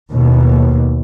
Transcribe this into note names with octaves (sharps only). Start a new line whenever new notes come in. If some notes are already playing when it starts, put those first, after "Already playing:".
D#2 B2